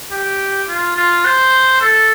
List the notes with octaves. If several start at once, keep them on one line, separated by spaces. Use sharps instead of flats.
G4
F4
F4
C5
A4